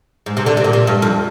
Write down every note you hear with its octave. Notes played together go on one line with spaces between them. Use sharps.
G#2
C3
D3
C3
A#2
C3
G2
F2